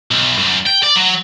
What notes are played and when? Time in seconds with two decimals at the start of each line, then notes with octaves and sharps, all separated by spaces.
0.11 B1
0.39 F#2
0.67 G5
0.84 D5
0.96 F#3